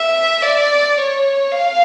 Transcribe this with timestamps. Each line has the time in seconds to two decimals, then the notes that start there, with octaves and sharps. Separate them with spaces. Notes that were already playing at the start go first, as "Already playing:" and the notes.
Already playing: E5
0.43 D5
0.98 C#5
1.52 F5